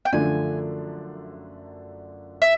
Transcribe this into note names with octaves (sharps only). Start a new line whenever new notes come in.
G5
F#2 D3 F3 A3 D4 G#5
E5